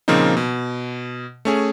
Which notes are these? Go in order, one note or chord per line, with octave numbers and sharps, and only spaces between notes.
A#2 C#3 F3 A#3 C4 D#4
B2
A3 C#4 G#4